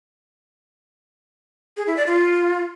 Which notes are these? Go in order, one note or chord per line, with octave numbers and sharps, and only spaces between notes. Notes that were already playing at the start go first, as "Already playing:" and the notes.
G#4
E4
D5
F4